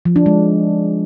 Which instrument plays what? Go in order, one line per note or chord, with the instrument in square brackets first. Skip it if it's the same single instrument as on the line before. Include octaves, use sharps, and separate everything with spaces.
[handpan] F3
D4
G#3